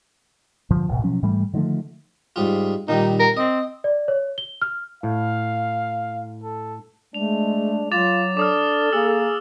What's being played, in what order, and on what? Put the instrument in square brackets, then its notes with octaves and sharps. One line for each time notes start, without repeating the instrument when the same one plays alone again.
[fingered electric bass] G2 D3 F3
D1 G#1 B2
B2 F3 F#3 C#4
G#2 E3 G3 A3
D3 D#3 F3 A3
[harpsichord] G#2 G3 F4
[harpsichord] A#2 D#3 G3 [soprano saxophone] D#4
[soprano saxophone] A#4
[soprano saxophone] C4 [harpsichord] D#5
[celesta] D5
C#5
G7
F6
[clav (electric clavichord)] A2 [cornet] F5
[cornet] A4
[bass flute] G#3 [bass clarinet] A3 [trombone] D4 [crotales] F7
[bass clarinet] F#3 [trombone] F4 [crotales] D6 A6 F7
[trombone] D4 [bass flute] A4 [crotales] D6 D#6 F6
[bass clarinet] A#3 [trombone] G#4 [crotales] E6